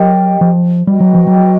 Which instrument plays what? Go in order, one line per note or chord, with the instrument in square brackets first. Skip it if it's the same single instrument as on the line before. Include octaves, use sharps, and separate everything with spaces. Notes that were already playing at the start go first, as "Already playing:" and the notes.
Already playing: [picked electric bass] F#3 [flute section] G4 A#4 D#5 G5
[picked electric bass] F3
[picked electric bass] G3 [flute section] F#4 B4 D#5 G5
[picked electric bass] F#3
F3
F#3